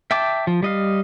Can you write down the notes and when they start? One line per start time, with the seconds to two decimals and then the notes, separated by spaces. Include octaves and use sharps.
0.11 E5 G5 A5 D6
0.47 F3
0.63 G3 D#5 F5